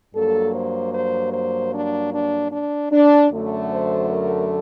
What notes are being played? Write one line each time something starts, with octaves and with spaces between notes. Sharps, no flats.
G2 F#3 A#3 A4
C5
C5
C5
D4
D4
D4
D4
F#2 D3 F#3 A3
C5
A#4